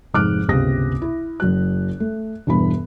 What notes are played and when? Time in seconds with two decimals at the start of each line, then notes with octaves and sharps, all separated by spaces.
0.14 F1 G#2 D6 F6 F#6 D7
0.48 G1 C#2 C3 G4 D#6 A#6
1.02 E4
1.40 F#1 F#3 F#6
2.00 A3
2.47 E1 G2 E3 B5